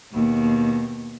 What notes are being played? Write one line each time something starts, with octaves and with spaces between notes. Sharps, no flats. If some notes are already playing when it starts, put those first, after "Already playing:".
D#2 B2